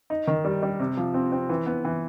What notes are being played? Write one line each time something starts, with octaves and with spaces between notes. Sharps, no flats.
D#4
D#3
G3
G3
C3
F3
C4
C4
E3
B3
E3